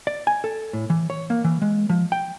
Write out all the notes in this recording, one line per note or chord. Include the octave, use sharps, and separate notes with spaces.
D5
G#5
A4
A2
E3
C#5
A#3
E3
G#3
F3
G5